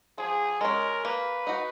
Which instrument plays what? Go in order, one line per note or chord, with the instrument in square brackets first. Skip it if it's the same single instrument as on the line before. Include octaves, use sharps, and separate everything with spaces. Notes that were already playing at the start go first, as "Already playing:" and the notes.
[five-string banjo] F3 [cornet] G#4
[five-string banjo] G#3 C#4 [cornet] A#4
[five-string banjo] A#3 [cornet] B4
[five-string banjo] D#4 F#4